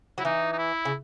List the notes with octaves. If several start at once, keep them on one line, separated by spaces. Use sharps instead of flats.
F#3 E4
E3 D#4
D#4
E4
C#3